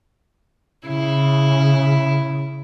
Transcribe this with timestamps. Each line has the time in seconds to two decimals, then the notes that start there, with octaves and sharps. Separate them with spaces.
0.87 C#3 E4